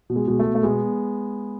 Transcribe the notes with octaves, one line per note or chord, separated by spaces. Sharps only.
B2
G#3
B2 G#3
A3
B2
A3
B2 G#3 B3